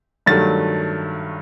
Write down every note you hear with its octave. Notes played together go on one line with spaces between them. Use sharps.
G2 D#3 F#3 A3 A6